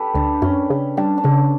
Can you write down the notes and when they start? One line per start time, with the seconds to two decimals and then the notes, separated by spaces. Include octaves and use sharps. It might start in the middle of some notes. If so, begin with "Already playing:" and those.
Already playing: G4 A4 B4
0.14 D2 D4
0.42 F#2 C#4
0.70 C#3
0.97 G3 D4
1.18 D4
1.24 C#3 C#4